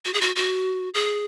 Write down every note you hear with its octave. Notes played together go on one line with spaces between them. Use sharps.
F#4
G#4
F#4
F#4
G#4